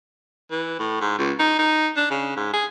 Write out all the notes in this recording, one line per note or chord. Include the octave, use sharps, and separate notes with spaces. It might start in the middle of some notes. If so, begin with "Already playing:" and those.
E3
A2
G#2
C#2
D#4
D#4
D4
C#3
G#2
G#4